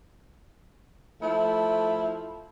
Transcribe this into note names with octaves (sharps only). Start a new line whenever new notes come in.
F3 A3 E4